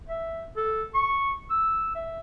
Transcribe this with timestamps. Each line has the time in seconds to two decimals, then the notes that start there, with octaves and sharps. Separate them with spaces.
0.09 E5
0.57 A4
0.95 C#6
1.51 E6
1.95 E5